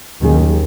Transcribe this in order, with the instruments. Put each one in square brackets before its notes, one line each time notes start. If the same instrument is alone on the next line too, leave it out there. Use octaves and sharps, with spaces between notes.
[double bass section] D#2 D#3 [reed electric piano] B2 F#3 C#4 G#4